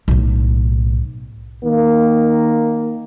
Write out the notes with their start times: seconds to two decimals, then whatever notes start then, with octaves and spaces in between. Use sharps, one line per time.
0.08 B1 A2
1.65 D#3 A#3